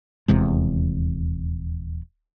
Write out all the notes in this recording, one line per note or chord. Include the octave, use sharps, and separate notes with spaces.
D#1 E2 C3 G#3